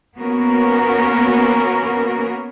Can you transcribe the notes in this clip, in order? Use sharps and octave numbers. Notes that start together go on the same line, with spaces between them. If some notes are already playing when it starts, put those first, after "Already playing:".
A#3 B3 C#4 F#4 A#4